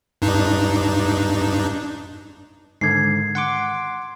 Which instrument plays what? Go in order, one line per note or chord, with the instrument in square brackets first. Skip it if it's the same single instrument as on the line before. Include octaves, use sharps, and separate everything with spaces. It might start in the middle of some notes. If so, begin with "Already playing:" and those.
[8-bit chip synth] G2 D4 D#4
[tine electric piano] G#2 D3 D#3 [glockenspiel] G#6 C7
[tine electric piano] F#5 C6 D6